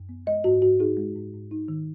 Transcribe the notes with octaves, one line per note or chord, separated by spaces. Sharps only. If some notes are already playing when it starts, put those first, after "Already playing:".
Already playing: F#2
B3
G#3 D#5
G#2 F#4
G#2 F#4
D#4 G#4
G#3
G#2
G#2
D#4
D#3